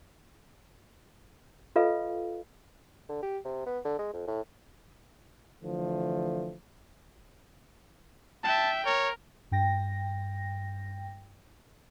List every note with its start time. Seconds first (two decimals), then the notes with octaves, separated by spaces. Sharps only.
1.76 F4 A4 B4 D#5 F5
3.09 D3
3.22 G4
3.45 C3
3.66 B3
3.85 D3
3.99 G#3
4.14 F2
4.27 A2
5.62 D3 E3 F3 A3
8.44 E5 G5 A5
8.86 A#4 C#5
9.51 G2 G5 A#6